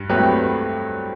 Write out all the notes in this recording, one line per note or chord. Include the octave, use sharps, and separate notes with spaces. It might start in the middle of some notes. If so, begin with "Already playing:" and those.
Already playing: G2
F#3 A3 C4 G4 B4